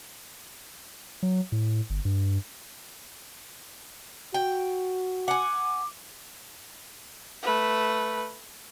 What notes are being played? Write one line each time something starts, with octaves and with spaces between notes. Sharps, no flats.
F#3
A2
G1
G2
F#4 G5
F#5 G#5 D6
A3 B4